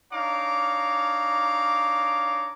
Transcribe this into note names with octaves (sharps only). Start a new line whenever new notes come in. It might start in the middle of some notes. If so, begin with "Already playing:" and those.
D4 D#4 C#5 F5 A#5 D6